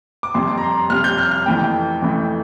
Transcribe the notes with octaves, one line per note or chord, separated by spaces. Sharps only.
D6
F2 C3 G3 C6
A#5
C6
F2 C3 G3 F6
G6
F6
F6
F2 E3 A3 G5
F2 E3 A3